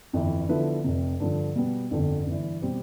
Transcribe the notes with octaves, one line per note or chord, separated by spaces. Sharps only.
G1 F2 E3
D3 F3 B3 E4 B4
F1 F2 C3
G2 D3 F3
B2 G3 B3
G1 F2 D3
G1 G2 E3
B2 G3 C4 G4